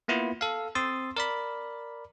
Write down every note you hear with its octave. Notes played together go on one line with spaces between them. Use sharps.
A#3 B3 E4 F4
A4 F5
C4 C6 D#6 E6 A6
A#4 D5 B5